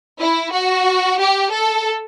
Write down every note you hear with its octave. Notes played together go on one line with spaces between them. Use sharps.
E4
F#4
G4
A4